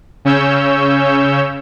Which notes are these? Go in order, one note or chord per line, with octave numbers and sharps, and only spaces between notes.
C#3 C#4 C#5 E6 G6